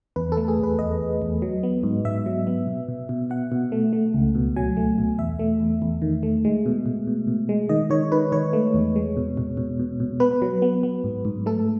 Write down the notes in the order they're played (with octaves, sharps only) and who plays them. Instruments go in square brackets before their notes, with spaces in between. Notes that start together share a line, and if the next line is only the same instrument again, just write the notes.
[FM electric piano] E2 B4
A4
A3
G#4
E2 B4
E2 D#5
E2
E2
F#3
B3
G#2
G#2 E5
F#3
B3
B2
B2
B2
B2 F#5
B2
A3
A3
C#2
B2
F#3 G#5
A3
B2
E2 E5
A3
E2
E2
D#3
A3
G#3
B2
B2
B2
B2
G#3
D#3 D#5
D#3 C#5
D#3 B4
D#3 C#5
A3
E2
G#3
B2
B2
B2
B2
B2
B3 B4
F#3
B3
B3
G#2
G#2
A3 A4